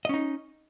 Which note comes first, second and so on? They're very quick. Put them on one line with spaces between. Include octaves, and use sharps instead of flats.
D#5 C#4 D#4